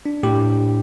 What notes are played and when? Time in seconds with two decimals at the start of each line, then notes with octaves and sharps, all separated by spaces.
0.06 D4
0.23 A2 G4